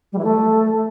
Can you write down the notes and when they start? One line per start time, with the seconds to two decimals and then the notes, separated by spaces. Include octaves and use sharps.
0.12 G3
0.18 E3
0.24 A3